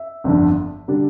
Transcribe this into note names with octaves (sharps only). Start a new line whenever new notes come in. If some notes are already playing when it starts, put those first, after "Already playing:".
Already playing: E5
G1 F2 D3
D3 G3 D4